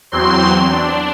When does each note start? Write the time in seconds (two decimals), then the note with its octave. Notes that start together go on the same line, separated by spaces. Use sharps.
0.12 E2 F#3 C4 C6
0.71 D4